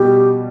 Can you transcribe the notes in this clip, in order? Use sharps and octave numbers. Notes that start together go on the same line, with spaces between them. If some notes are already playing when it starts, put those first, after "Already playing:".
Already playing: B2 G3 G4